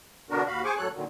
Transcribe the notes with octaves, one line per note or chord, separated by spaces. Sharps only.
B2 D3 B3 D4 F#4 A#4
D#2 F#4 F5 B5
G#4 C5 G#5 C#6 D6
F#2 A2 F#3 A4 C#5 F#6
A#2 D3 D#3 F#3